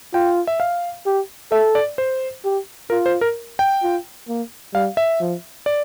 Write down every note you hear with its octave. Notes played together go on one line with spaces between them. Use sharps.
F4 G5
E5
F5
G4
A4 E5
D5
C5
G4
F4 A#4
C5
A#4
G5
F4
A#3
G3 F5
E5
F3
D5